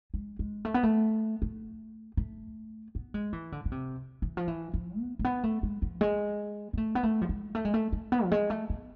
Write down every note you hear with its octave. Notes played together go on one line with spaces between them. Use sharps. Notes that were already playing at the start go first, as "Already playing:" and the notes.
G#3
G#3
A3
B3
A3
A3
A3
B3
G#3
E3
D3
D3
C3
E3
F3
E3
F3
B3
A3
B3
A3
G#3
F3
G#3
B3
A3
B3
A3
F3
G#3
A3
G#3
A3
A3
B3
F3
G#3
A3
B3